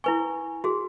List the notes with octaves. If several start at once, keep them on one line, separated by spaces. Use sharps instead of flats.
E4 B4 G#5 C#6
F#4 G#4 C6